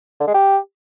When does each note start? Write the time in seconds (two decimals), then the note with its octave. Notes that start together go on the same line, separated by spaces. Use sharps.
0.20 D3
0.27 G#3
0.34 G4